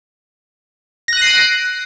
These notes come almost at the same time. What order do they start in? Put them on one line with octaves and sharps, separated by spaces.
A#6 F#6 D#7 C7 D7